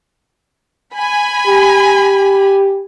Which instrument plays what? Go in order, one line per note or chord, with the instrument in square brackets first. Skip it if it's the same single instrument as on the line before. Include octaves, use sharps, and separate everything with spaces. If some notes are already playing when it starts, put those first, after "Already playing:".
[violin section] G#5 B5
[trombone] G4